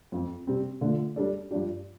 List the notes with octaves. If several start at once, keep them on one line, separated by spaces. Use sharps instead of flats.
F2 F3 C4
C3 G3 C4
D3 A3 F4
G3 D4 A4 D5
G2 F3 D4 G4